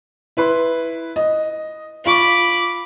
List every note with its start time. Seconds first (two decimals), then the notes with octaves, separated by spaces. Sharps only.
0.37 E4 B4 C6
1.16 D#5
2.06 F4 B5 C#6 D6